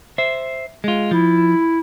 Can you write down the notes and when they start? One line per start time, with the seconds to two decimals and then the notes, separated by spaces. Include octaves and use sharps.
0.18 C5 E5
0.84 G#3 F4
1.11 F3 E4